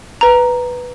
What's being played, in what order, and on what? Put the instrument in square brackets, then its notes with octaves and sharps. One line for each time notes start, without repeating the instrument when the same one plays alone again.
[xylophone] B4 A#5